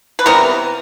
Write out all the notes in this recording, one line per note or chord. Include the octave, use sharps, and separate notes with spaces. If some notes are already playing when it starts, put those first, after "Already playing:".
B4
C3 E3 G3 B3 A#4